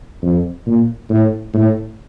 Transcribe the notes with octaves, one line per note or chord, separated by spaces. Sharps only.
F2
A#2
A2
A2